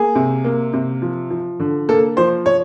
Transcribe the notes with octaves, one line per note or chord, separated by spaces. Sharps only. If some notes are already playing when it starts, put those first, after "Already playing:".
Already playing: A#3 G#4
C3
A#3
C3
F3
F3
D3
A#3 A4
F3 C5
C#5